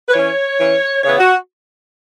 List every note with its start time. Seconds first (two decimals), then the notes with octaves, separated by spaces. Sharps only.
0.08 B4
0.13 E3 C#4 C#5
0.58 E3 C#4
1.04 C#3 E3 B3 C#5
1.19 F#4